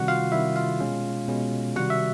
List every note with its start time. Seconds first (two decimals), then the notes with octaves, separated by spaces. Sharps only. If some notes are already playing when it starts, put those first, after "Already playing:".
Already playing: C3 D#3 G3 F#4 F#5
0.08 F4 F5
0.32 C3 D#3 G3 E4 E5
0.56 F4 F5
0.81 B2 G#3 C#4
1.28 B2 G#3 C#4
1.76 C3 D#3 G3 F#4 F#5
1.90 E5